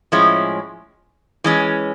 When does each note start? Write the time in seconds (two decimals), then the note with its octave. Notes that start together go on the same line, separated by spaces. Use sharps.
0.12 A2 F3 G#3 C#4 E4
1.44 E3 G#3 C#4